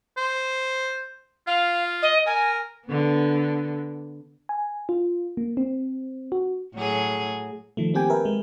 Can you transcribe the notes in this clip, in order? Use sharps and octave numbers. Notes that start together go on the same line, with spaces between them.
C5
F4 F5
D#5
A#4 G#5
D3 B3
G#5
F4
A#3
C4
F#4
A2 F#3 G#4
D#3 F3 A3
A#3 C4 G4 G5 G#5
A#4 B4 E5
G#3